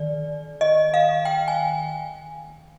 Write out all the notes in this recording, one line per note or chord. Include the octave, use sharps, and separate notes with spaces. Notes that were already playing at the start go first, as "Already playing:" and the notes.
Already playing: D#3 D5
D#5
F5
G5
G#5